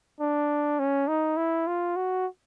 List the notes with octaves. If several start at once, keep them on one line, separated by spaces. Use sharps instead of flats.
D4
C#4
D#4
E4
F4
F#4